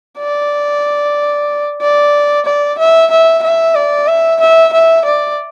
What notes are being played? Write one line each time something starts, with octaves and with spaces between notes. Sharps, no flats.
D5
D5
D5
E5
E5
E5
D5
E5
E5
E5
D5